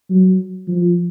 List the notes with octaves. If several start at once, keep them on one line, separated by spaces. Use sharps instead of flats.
F#3
F3